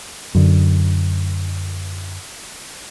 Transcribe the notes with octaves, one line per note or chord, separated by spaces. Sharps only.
F#2 D3